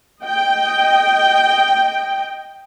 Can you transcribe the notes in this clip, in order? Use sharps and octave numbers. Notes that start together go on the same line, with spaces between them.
D#5 G5